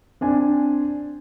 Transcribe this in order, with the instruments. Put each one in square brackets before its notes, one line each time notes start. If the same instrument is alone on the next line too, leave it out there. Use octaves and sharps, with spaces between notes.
[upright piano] C4 D4 G#5